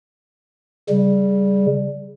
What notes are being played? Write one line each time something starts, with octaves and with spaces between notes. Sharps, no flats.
C#3 G3